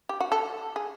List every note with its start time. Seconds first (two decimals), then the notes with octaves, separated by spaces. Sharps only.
0.09 G4
0.20 F#4
0.32 A4
0.76 G#4